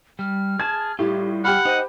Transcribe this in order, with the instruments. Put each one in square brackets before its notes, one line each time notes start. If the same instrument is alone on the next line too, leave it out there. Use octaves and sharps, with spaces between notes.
[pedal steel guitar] G3 [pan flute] F6
[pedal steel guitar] G#4 A5 [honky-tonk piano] G#6
[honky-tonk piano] A2 [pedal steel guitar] G3 F4 [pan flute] G4
[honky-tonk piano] G4 G5 B5 [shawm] F#5 [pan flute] F6
[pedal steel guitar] D#4 D#5 [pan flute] C5